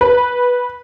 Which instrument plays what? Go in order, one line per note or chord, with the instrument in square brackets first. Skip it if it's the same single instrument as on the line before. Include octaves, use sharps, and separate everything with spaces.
[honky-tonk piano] B4